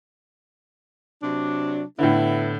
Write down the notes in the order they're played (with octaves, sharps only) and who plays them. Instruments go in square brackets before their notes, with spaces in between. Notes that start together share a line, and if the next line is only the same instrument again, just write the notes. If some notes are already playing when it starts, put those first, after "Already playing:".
[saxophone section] C3 F#3 D4
[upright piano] A2 D3 [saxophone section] B3 E4